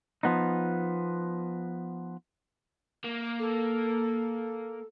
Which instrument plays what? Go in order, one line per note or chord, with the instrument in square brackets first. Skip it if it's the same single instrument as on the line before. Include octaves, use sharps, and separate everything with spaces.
[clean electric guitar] F3 B3 D#4
[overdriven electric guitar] A#3
[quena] A4